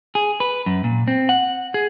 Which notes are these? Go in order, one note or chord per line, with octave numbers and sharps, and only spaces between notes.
G#4
B4
F#2
A#2
C4
F#5
G#4